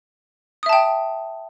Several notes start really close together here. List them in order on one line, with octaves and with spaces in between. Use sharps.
D#6 E5 A5 G5